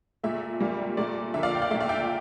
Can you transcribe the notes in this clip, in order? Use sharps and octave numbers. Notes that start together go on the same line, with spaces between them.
A#2 A3 E5
A#2 G3 A#3
A#2 A3 D5
D3 F3 A#3 E5
D5 F5
G5
D5 F5
A#2 A3 E5
D5 F5
E5 G5